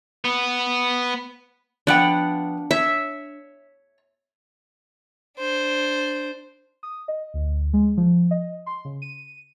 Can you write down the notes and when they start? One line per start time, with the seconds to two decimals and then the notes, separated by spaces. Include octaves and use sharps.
0.25 B3
1.87 F3 B3 D4 F#5 G5
2.71 C#5 E5
5.38 D4 C5
6.83 D#6
7.08 D#5
7.34 D2
7.73 G#3
7.97 F3
8.31 D#5
8.66 C6
8.85 C#3
9.02 D#7